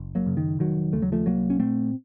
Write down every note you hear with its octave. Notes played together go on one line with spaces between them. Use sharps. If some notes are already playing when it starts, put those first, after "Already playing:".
Already playing: F#1
F#3 A#3
F#2 C#3
D#3
F1 D#3 F#3
D#2 C#3 A3
F#3
F3 A3
C2 F#3 A#3
C#4
A#2 A3 C4